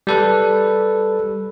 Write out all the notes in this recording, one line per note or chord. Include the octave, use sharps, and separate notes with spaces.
G3 A4 B4